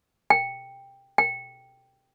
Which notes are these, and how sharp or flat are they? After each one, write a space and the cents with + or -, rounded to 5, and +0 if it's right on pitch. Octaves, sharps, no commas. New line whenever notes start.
G5 +10
G5 +0